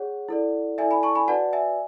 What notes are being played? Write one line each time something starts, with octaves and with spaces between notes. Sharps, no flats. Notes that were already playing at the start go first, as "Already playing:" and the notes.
Already playing: G#4 C#5 F#5
E4 A4 D5
E4 A4 D5 E5 G#5
G#5 B5
A5 C#6
G#5 B5
F#4 B4 D5 F#5 A5
E5 G#5